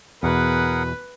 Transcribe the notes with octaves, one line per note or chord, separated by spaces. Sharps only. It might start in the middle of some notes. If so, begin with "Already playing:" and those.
E2 B2 G#4 A#4 B4 F#5